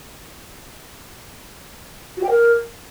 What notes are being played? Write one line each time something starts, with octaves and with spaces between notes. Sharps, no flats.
F#4
G5
A#4